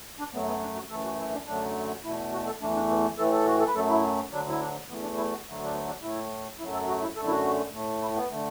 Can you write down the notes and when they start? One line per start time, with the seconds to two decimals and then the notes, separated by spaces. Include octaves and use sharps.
0.19 D4
0.33 F#2 F#3 A3 B3
0.47 B3
0.61 D4
0.75 F#4
0.90 F#2 E3 A3 A4
1.04 F#4
1.18 E4
1.33 D4
1.47 F#2 D3 F#3 A3 D4
2.04 E2 B2 A3 E4
2.33 F#4
2.46 A4
2.61 E2 E3 A3 D4
2.75 D4
2.90 B3
3.17 A2 E3 A3 A4
3.32 A4
3.46 F#4
3.60 A4
3.67 B4
3.74 F#2 F#3 A3 A4
3.89 E4
4.31 D2 D3 F#3 D4
4.49 E4
4.60 D4
4.89 E2 E3 A3 B3
5.02 D4
5.17 E4
5.31 F#4
5.45 D2 D3 F#3 A3
5.63 D4
5.74 B3
5.88 D4
6.02 A2 A3 E4
6.59 F#2 F#3 A3 E4
6.73 A4
6.88 F#4
7.02 E4
7.16 F#2 D3 A3 A4
7.27 E4
7.30 F#4
7.73 A2 A3
8.02 E4
8.16 B3
8.30 D3 A3